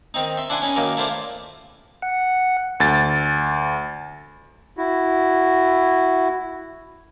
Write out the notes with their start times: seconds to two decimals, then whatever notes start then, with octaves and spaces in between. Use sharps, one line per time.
0.14 D#3 C4 D#4
0.37 E5 C6
0.50 D4 E4 F#5 G#5 C6
0.62 C#4 D#4 B5
0.76 F#2 D#3 A#3
0.97 A3 E4 F4 C5 D5
2.02 F#5
2.80 D2 A6
4.77 E4 F#4